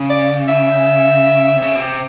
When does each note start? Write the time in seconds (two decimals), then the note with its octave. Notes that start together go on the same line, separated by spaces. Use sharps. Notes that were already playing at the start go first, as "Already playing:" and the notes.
Already playing: C#3
0.10 D5
0.48 E5
1.56 C3
1.62 C#3
1.76 B2
1.80 C3